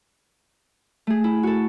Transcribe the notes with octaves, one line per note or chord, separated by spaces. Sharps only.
A3 G#4
E4
F#4 A4